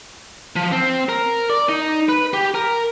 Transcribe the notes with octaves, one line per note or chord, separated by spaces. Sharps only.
F3
C4
A#4
D5
D#4
B4
G4
A#4